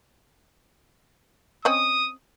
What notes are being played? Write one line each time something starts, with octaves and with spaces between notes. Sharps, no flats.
C4 C#4 D#5 D#6